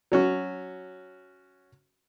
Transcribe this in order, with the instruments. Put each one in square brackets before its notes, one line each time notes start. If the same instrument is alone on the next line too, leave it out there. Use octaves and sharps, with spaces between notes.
[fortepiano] F#3 C#4 F#4